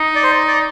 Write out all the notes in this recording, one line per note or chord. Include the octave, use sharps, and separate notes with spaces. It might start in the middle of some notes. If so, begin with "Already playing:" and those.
Already playing: D#4
D5
C5
D5
D5